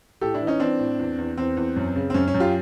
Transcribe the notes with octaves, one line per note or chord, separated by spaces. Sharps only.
A2 G4 A4
D4 E4
E3
C#4 D#4
E3 C4 D4
A2
E2
E2
E2 C4
E2
F#2
C#3
C4
F#2 C#4
C#4
F#2
F4 G4